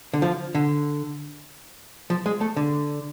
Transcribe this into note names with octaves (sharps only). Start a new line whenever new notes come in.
D3
F3
D3
F3
G#3
A3
D3